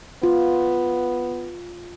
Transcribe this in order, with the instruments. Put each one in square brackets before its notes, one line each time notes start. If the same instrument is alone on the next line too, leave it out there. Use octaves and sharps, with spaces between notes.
[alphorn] B3 [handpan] F4